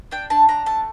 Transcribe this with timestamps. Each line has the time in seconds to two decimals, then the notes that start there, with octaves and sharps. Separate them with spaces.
0.11 D4 G5
0.30 D4 A5
0.49 D4 A#5
0.66 A3 A5